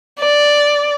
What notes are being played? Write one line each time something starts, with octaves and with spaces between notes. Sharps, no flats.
D5